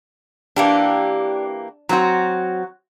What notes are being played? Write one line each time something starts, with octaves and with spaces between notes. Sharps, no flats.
E3 A#3 D4 G4
F#3 C4 F#4 A#5